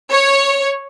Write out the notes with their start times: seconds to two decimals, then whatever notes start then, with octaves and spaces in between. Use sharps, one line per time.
0.11 C#5